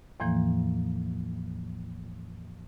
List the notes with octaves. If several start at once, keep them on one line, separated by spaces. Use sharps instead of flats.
E2 A2 E3 F3 A#3